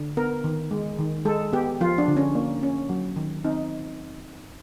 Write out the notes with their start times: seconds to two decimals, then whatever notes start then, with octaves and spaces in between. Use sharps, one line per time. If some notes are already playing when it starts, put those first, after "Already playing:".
Already playing: D3
0.17 B3 A#4
0.44 D#3
0.71 G#3
0.99 D#3
1.25 G#3 A4
1.53 B3 G4
1.81 F3 F4
1.98 D4
2.08 D3
2.17 C#4
2.35 A#3
2.63 C#4
2.89 F#3
3.16 D#3
3.45 C4 D#4